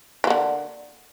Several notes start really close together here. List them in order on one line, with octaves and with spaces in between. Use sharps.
E3 A#3 D3